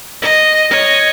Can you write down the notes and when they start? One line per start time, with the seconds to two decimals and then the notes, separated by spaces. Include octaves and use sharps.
0.22 D#5
0.71 C#5 D#5